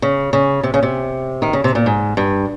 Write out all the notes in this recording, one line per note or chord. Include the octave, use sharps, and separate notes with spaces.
C#3
C#3
C3
C#3
C3
D#3
C#3
C3
A#2
G#2
G2